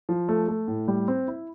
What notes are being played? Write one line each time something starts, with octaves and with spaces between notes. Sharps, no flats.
F3
A3
A3
A2
G3
C4
E4